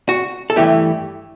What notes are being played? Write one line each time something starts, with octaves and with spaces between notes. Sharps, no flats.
F#4
A4
G2 E3 A3 E4 G4